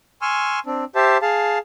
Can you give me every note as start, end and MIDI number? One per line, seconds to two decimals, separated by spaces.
0.22 0.59 80
0.22 0.59 84
0.22 0.59 85
0.22 0.59 88
0.22 0.59 89
0.66 0.84 60
0.66 0.84 62
0.95 1.18 67
0.95 1.18 72
0.95 1.18 76
0.95 1.18 81
1.22 1.59 68
1.22 1.59 77
1.22 1.59 81